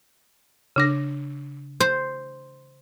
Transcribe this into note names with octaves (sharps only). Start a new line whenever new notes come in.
C#3 D4 A#6
C5